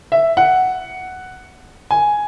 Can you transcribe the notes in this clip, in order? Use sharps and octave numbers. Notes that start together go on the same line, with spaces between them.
E5
F#5
G#5